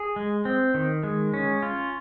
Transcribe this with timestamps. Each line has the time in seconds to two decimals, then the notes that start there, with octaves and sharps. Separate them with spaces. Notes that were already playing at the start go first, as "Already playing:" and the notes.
Already playing: G#4
0.16 G#3
0.45 C4
0.74 D#3
1.03 G#3
1.34 C#4
1.62 F4